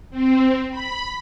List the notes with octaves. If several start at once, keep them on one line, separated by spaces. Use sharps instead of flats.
C4
B5